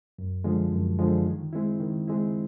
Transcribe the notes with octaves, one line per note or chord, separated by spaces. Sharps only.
F#2
D3 F3 G#3
F#2
D3 F3 G#3
D#3
G#3 C4 E4
D#3
G#3 C4 E4